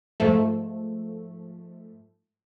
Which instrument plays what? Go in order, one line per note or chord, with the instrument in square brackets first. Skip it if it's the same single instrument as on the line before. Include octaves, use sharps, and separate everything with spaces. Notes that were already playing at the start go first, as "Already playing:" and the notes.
[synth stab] G#2 F3 A3